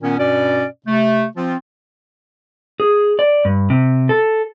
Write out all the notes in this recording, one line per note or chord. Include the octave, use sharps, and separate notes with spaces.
A#2 D#3 B3 C#4
G2 B2 C#4 D5
C3 A3
F3 C4 F4
G#4
D5
G2
C3
A4